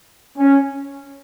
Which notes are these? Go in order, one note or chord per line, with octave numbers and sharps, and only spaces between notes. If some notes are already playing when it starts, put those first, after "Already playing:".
C#4